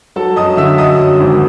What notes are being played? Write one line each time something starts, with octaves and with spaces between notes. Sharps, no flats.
F#3 A4 A5
F#2 D#5 D#6
D3 E5 E6
F#2 D#5 D#6
F#2
G#1